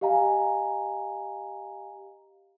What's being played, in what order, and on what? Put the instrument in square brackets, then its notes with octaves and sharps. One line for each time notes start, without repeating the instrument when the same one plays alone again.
[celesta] G4 D#5 F5 G#5 A#5